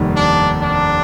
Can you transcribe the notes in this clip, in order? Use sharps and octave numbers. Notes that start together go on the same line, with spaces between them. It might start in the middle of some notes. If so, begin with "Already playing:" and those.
Already playing: F1 D#2 D#3 G3
D4
D4